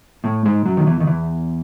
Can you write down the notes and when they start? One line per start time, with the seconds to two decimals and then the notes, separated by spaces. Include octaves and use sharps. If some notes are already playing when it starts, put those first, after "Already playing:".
0.24 A2 A3
0.45 G#2 G#3
0.66 F#2 F#3
0.77 D#3
0.86 E2 E3
1.00 D#3
1.07 E2 E3